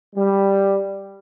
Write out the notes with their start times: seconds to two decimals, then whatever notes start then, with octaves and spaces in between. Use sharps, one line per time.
0.16 G3